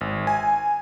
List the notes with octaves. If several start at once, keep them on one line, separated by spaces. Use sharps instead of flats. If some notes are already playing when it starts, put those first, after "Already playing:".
G#1
G#5